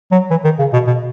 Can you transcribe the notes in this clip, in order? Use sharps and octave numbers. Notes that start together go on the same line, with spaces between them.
F#3
E3
D#3
C#3
B2
B2